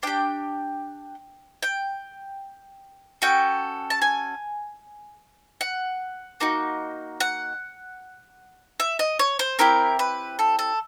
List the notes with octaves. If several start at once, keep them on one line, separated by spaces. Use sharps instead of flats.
D4 G4 G5
G5
C#4 F#4 A4 G5
A5
G#5
F#5
A#3 D#4 F#4
F#5
E5
D#5
C#5
C5
C4 E4 G4 A#4
B4
A4
A4